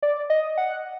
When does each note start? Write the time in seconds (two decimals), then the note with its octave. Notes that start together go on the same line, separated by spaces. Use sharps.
0.03 D5
0.30 D#5
0.57 F#5